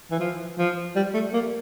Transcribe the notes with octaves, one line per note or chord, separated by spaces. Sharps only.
E3
F3
F3
G3
A3
A#3